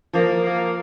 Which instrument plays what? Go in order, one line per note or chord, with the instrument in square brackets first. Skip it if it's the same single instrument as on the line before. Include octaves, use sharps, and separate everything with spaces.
[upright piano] F3 [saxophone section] A#3
[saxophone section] A#3